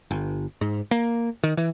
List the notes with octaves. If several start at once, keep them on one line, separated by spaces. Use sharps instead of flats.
G1
G#2
A#3
D#3
E3